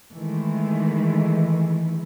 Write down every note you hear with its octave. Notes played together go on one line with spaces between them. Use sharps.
D#3 E3 G#3 A3